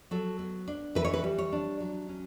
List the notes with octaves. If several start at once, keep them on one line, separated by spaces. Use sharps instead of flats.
F#3 A4
B3
D4
E3 B4
C#5
B4
G3
C#5
D4
F#3
C#4